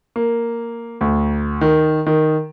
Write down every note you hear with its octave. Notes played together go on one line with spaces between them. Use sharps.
A#3
D2
D#3
D#3